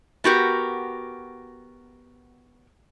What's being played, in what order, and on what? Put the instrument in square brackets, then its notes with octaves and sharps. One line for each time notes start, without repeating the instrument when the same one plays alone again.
[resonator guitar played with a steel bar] B3 F#4 G4 A#4